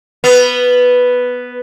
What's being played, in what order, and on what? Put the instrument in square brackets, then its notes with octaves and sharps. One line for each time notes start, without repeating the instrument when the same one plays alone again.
[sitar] B3 [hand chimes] B4